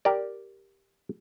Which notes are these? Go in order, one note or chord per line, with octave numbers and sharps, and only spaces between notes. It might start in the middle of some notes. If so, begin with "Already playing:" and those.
G4 A#4 D5